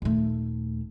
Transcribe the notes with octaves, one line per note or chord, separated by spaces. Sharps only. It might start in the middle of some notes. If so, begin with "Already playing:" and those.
D#1 A3